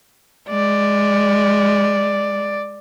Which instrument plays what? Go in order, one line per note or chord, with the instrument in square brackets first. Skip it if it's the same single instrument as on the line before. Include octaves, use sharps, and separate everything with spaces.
[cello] G#3 [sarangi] D5